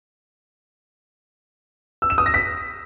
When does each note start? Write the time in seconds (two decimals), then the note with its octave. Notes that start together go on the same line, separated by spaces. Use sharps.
2.02 E6
2.10 E7
2.18 D#6
2.26 A#6
2.34 B6